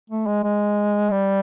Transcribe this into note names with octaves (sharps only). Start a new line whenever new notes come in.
A3
G#3
G#3
G3